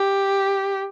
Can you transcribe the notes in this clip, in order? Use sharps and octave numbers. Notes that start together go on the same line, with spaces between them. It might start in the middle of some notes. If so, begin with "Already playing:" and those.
Already playing: G4